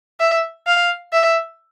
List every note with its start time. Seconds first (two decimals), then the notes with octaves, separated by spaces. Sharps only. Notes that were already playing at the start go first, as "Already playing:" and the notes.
0.20 E5
0.67 F5
1.13 E5